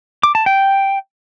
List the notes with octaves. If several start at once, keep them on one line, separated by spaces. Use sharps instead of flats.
D6
A5
G5